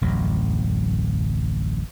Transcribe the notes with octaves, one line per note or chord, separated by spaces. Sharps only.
D1 A1 F2 F#3